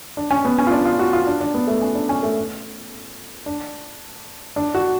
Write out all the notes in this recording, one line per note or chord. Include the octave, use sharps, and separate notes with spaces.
D4
C#4
B3
C#4
F4
D4
F4
F#4
F4
D4
D4
B3
A3
C#4
D4
C#4
A3
D4
D4
F#4